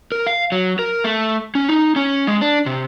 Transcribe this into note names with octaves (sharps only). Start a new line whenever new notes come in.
A#4
F5
F#3
A#4
A3
C#4
D#4
C#4
G#3
D4
C3